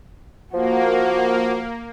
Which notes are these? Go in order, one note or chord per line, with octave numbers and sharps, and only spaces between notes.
F3 A#3 F#4 F#5